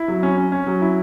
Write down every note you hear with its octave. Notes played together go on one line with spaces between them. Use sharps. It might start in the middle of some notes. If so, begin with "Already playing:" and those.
Already playing: E4
F#3
C#4
C#4
C#4
F#3
E4